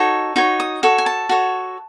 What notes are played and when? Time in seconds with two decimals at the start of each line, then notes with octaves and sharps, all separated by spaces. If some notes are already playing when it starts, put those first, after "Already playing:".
Already playing: D#4 F#4 A4 C#5
0.36 D#4 F#4 C#5
0.60 D#6
0.83 F#4 A4 C#5
0.98 G#5
1.06 A5
1.29 F#4 A4 C#5